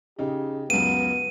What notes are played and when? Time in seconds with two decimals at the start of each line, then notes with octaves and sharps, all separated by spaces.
0.19 C#3 D#4 G4
0.70 C#2 F#2 B3 D#7